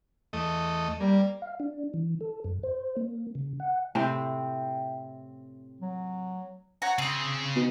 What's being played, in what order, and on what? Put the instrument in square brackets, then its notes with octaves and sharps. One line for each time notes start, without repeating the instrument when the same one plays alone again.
[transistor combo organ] E2 A3 D#5
[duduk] G3 [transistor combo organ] A#3
[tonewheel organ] F5
D4
E3
A4
F#2
C5
A#3
C#3
F#5
[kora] A2 C3 C4 [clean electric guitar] E5 G5
[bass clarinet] F#3
[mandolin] F#4 C#5 A#5
[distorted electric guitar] C#3 G#4 [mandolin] C4
[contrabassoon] B2